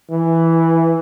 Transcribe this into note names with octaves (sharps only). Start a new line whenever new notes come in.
E3